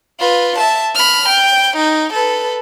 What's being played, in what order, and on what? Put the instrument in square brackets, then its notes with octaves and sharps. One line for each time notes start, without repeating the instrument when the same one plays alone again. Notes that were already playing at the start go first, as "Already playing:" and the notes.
[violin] F4 B4
E5 A5
B5 F6
G5
D#4
A4 B4